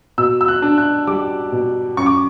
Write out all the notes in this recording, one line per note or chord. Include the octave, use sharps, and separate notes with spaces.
B2 E6
E6
F#6
D4
F#6
G3 D6
B2
F#2 C#6
D6